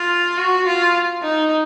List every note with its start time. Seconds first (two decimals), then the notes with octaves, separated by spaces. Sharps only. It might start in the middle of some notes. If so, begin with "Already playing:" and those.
Already playing: F4
0.38 F#4
0.67 F4
1.23 D#4